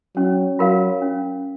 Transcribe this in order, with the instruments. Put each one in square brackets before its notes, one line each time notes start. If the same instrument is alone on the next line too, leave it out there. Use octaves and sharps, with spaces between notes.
[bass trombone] F#3 [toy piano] C#4
[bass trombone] F#3 [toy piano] F4 A#4 F5
[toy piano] C#4